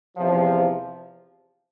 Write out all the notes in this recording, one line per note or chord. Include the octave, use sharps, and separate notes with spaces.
E2 C3 F3